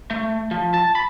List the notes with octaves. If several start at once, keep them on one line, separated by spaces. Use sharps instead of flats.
A3
F3
A5
B5